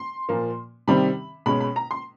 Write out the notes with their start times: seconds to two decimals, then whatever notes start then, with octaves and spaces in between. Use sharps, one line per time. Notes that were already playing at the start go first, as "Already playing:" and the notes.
Already playing: C6
0.29 A#2 F3 A#3
0.87 C3 D#3 G3 C4 B5
1.46 B2 G#3 C#4 B5
1.61 B5
1.76 A#5
1.91 C6